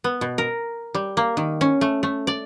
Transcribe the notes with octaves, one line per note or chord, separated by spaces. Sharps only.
B3
B2
A#4
G3
A#3
D#3
C#4
A3
A3
D5